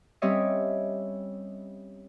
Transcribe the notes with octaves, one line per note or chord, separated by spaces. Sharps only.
G3 C4 C#4 C#5 D#5 E5